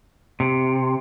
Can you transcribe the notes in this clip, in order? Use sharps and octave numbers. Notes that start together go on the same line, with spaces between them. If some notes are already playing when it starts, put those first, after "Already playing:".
C3